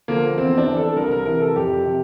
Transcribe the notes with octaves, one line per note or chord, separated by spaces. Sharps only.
D3 F3 A#3
E2 C4
D4
E3
A4
C2 A#4
A#4
C3 E3 A#4
A4
F2 G4
C3